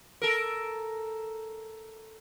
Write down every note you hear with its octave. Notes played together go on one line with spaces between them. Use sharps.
A4 A#4